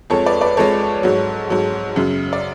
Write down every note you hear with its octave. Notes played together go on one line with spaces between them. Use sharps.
F2 F3 G#3 A4 C#5
B4 D5
B4 D5
F2 F3 G#3 A4 C#5
G#2 F#3
G#2 F#3
F#2 C#3 F#3
D5